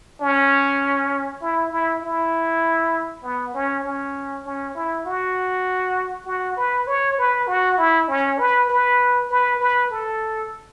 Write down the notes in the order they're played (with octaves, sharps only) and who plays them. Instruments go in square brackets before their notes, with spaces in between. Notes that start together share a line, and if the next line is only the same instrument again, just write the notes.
[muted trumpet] C#4
E4
E4
E4
B3
C#4
C#4
C#4
E4
F#4
F#4
B4
C#5
B4
F#4
E4
C#4
B4
B4
B4
B4
A4